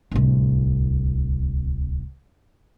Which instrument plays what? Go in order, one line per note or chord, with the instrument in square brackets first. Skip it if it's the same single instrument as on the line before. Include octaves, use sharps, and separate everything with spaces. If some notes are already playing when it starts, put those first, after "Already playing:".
[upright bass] D1 C2